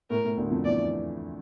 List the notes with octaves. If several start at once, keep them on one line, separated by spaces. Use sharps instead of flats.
A2 A#4
A2
D2 D3
F2 F3
E2 E3 D5